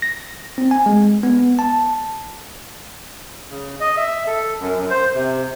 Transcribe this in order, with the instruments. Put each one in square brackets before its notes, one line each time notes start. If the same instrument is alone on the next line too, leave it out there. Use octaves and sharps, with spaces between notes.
[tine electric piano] A#6
C4
G#5
G#3
B3
A5
[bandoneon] C#3
D#5
E5
A4
F#2
F#2
C5
C3